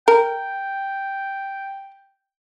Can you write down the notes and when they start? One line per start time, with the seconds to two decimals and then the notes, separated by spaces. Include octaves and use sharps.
0.08 A#4 G5